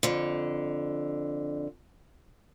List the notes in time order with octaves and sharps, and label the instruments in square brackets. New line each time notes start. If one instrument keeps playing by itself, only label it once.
[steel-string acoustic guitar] F2 D3